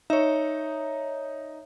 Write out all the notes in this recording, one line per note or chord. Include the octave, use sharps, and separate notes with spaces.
D#4 C#5 E5